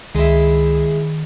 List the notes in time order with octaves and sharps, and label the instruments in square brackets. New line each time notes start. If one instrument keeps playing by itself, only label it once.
[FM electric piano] C#2 [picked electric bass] D#3 [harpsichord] G#3 E4